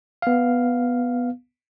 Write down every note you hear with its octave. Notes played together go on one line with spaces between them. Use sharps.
B3 F5